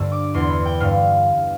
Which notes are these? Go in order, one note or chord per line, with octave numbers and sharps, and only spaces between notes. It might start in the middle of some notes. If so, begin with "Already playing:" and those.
Already playing: G2 D3 E6
D6
E2 D3 C6
B5
G5
G2 D3 F5